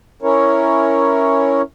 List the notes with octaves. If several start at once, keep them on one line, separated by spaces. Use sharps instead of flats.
C#4 E4 A#4 C#5